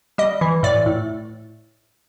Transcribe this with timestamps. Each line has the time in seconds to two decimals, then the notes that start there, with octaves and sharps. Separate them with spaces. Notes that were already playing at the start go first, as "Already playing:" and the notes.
0.18 G3 D#5
0.41 E3
0.63 A2 D5
0.86 A2